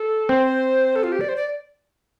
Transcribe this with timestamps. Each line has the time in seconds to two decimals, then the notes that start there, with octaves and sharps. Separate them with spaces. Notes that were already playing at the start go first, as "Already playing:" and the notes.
Already playing: A4
0.29 C4 C5
0.96 A4
1.03 F4
1.12 G4
1.21 D5
1.29 C5
1.36 D5